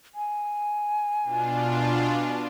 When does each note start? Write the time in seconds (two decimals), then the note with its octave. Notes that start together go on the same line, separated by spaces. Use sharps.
0.15 G#5
1.23 B2 D4 F4